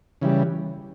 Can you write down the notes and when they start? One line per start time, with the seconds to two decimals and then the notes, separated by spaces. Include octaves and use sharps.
0.21 C#3 E3 G3